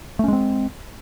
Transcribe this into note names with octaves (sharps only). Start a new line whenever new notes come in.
G#3 A3 C4 C#4